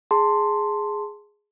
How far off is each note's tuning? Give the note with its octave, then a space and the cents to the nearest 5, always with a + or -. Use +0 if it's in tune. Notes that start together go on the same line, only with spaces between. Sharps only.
G#4 +0 A5 +20 C6 +0